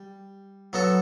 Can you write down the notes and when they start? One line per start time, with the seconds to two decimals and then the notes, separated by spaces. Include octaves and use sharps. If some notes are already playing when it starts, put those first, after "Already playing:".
Already playing: G3
0.73 F#3 B3 F#4 A4